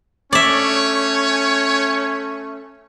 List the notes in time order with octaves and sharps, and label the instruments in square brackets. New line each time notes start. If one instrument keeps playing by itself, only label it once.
[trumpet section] A3 C#4 [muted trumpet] C#5 [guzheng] D5 E5